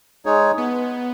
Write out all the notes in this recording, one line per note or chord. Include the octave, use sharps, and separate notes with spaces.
G#3 D#4 G#4 C#5
B3